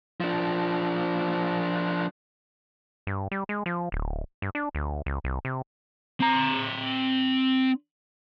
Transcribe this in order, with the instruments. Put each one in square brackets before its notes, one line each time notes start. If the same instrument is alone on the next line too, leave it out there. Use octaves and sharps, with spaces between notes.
[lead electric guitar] F3 D4
[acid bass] G2
G3
G#3
F3
D1
G2
D4
D2
C#2
C2
C3
[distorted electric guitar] C4 A#5